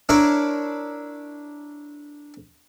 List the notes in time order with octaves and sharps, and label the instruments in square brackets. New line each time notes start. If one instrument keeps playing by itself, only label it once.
[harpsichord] D4 E4 A#4 C#5 D5